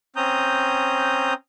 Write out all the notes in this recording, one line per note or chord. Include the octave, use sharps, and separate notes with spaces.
C4 C#4 A#5 D#6 G6